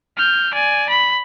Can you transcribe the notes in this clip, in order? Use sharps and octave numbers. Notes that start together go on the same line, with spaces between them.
F6 G6
D5 G#5
B5